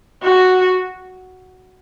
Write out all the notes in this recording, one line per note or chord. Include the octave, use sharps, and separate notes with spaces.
F#4